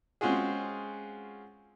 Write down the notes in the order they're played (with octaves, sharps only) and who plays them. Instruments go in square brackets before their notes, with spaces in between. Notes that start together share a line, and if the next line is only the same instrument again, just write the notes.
[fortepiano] G#3 C4 C#4 F4 F#4 G#4